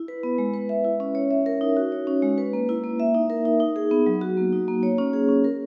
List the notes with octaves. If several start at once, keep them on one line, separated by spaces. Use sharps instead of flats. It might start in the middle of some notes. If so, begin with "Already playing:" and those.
Already playing: E4
B4
B3
G#3
B4
E5
E4
C#4
C#5
E5
A#4
D#4
F#4
C#5
C#4
G#3
B4
A#3
E4
A#3
E5
D#4
A#4
D#4
D#4
G#4
B3
F#3
F#4
A#3
D#4
A#3
C#5
C#4
G#4
C#4
A#4